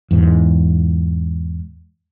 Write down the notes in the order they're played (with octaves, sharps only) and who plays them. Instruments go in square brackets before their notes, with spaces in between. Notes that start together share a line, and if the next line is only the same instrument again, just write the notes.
[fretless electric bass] E2 G#2